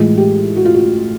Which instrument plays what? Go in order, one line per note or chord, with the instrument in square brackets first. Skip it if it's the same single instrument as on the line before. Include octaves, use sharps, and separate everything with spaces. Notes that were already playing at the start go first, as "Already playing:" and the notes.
Already playing: [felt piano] A2 E3 G#3 F4
G4
F#4
F4
F#4